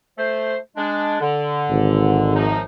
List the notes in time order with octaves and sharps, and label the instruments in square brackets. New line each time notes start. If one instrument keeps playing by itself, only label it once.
[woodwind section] A3 C5
G#3 D4
D3
[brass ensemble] G#1 G#2
[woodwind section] F#2 F3 D#4